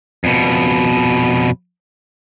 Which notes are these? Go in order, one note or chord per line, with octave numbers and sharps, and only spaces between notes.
F2 B2